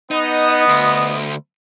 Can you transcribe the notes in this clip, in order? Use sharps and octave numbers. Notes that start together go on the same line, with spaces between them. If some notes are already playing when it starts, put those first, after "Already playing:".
B3 D#4 D#5
D2